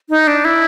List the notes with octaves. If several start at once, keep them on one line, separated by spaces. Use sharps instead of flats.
D#4
D4
E4